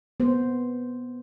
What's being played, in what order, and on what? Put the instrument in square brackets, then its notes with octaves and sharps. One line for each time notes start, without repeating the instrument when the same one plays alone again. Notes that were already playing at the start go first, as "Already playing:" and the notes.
[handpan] B3 C5